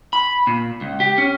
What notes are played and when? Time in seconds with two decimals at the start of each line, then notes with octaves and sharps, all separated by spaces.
0.13 B5
0.47 A#2
0.81 C#2
1.00 G4
1.18 C#4